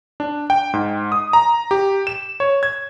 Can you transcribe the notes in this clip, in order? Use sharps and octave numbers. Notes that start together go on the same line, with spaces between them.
D4
G5
G#2
D#6
A#5
G4
E7
C#5
G#6